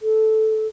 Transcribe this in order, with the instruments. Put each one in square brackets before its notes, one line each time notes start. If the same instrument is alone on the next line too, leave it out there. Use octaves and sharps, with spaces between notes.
[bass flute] A4